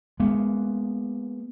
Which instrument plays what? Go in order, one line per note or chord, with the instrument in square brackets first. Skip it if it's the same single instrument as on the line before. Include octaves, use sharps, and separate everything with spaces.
[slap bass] G#3 A#3 B3